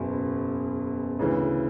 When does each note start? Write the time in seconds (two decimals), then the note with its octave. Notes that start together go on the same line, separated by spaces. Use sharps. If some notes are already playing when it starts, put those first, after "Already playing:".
Already playing: F#1 E2 B2
1.19 D2 C#3 E3